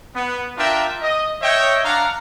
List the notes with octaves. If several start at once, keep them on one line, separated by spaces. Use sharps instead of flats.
B3
D4 F4 A#4 E5 G5
D#5
C#5 D#5 E5 G5
D4 F5 F#5 A#5